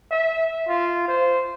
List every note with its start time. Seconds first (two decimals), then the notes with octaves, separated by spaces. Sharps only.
0.11 E5
0.69 F4
1.08 C5